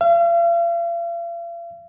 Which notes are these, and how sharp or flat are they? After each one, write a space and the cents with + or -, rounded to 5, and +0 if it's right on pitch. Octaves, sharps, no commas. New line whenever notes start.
F5 -45